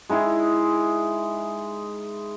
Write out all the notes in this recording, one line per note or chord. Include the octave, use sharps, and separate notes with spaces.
G#3 D#4 E4 G#4